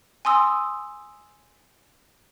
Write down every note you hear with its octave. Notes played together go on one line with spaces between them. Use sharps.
G#5 C6 D#6 E6